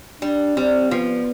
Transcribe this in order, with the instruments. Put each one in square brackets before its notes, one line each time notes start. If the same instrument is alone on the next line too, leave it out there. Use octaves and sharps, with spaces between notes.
[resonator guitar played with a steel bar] G3 [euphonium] D4
[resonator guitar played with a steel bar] G3 [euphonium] C4
[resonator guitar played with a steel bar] F3 [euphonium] B3